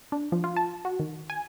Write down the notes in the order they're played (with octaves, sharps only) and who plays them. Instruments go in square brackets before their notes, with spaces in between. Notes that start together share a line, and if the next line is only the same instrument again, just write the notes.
[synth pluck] D4
F3
F4
A5
F#4
D#3
G#5